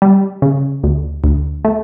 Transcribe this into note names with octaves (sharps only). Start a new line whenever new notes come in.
G3
C#3
D2
D2
A3